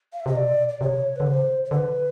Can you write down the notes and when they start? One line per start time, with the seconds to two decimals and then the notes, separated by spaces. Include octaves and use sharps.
0.13 F5
0.20 E5
0.26 C3 D#5
0.36 B2 D5
0.69 D5
0.81 C3 C#5
1.16 D3 B4
1.26 C#3 C5
1.65 C5
1.71 D3 B4